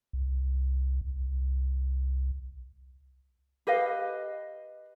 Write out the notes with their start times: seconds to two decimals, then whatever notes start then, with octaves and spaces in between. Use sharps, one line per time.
0.13 C2
1.01 C2
3.67 G4 B4 D#5 F5